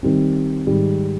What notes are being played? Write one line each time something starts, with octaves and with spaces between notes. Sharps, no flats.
D#3 G3 C4
G#2 D#3 G3